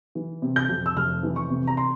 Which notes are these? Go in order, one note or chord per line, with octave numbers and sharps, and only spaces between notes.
E3
C3
G6
F2
E6
F1 F6
E3
C#6
C3
A#5
C6